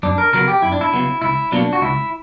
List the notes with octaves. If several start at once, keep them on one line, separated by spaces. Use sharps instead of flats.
F#2 D4
A#4
C#3 F#3 B3 A#4
G4
F#2 E4
D4
E4
C#3 F#3 B3
C#2 E4
B2 F#3 A#3 D4
F#4
C#2 E4